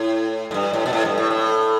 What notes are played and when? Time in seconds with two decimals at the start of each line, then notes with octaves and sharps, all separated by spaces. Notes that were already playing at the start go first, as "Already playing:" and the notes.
Already playing: A2
0.51 A2
0.54 G2
0.73 A2
0.86 B2
0.93 A2
1.05 G2
1.18 A2
1.31 A2